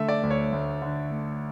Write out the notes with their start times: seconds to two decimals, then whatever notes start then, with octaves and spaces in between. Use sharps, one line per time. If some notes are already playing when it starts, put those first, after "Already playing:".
Already playing: D3 A3 E5
0.09 D5
0.23 D2
0.30 C#5
0.53 D2
0.82 D3
1.11 A3